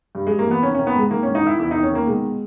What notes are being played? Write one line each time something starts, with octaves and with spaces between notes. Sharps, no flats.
G2
G2 G#3
A#3
E3 B3
D#3 C#4
D#3 C#4
B3
G#2 G#3
D#3 A#3
G#2 C#4
D#4
D#3 E4
E2 E4
D#3 D#4
C#4
D#3 A#3
B2 G#3